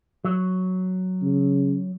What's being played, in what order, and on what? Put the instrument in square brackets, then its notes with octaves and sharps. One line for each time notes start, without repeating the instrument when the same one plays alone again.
[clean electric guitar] F#3
[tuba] C#3